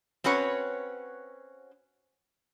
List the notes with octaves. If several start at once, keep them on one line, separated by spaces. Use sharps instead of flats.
C4 C#4 F#4 B4 C#5